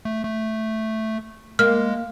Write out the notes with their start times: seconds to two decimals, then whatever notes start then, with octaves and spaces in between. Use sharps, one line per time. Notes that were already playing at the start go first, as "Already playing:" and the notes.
0.05 A3
0.24 A3
1.59 G#3 A#3 F6